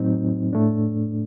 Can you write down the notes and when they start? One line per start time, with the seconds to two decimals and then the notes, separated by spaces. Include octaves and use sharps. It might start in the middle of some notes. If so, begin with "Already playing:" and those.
Already playing: A2 F#3 C4 D#4
0.53 A2 A3 D4